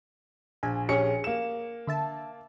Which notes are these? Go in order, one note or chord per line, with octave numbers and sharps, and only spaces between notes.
A#1 G#5
A#1 C#4 G4 G#4 C#7
A#3 E7
D3 E5 A5